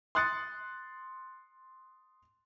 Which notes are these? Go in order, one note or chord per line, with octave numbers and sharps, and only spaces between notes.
C6 D#6 F#6 A6 C#7